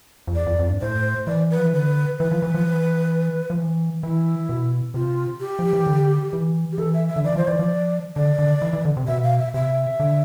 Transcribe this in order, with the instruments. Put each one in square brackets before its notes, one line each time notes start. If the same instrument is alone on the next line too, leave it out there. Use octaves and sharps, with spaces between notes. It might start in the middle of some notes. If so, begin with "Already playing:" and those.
[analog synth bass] F2
[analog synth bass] E2 [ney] D5
[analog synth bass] F2
F2
G2
[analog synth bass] A2 [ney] C5
[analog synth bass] E3 [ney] D5
[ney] B4
[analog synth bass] F3
E3
[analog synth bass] D3 [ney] B4
[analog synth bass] E3 [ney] B4
[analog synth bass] F3
E3
F3
E3
F3
E3
[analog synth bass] E3 [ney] E4
[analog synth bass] B2
[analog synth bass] C3 [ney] F4
[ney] G4
[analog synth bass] F3
E3
D3
E3
[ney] G4
[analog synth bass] E3 [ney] A4
[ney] E5
E5
[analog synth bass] D3
[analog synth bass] E3 [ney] D5
[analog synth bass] F3 [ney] C5
[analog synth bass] E3 [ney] D5
[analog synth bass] F3
[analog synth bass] D3 [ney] D5
[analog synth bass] D3
E3
E3
D3
C3
[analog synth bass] B2 [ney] E5
[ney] F5
E5
[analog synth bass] C3 [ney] E5
[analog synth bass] D3